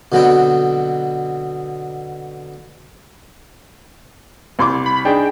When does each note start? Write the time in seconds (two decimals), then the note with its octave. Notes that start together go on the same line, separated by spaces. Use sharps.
0.12 B2 D3 F#3 B3 C4 G5
4.59 C2 C6 D6
4.86 B5
5.05 D4 D#4 G#4 G5